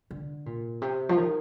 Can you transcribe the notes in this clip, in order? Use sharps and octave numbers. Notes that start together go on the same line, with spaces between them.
D3
A#2
C3
F3
D#3